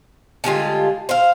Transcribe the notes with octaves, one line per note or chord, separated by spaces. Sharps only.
D3 G3 G#3 F4
C5 F5